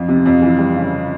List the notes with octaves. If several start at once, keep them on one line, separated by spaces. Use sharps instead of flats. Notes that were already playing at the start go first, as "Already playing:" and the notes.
Already playing: F2 F3 F4 F5
C3
F2
E3
G3
C#3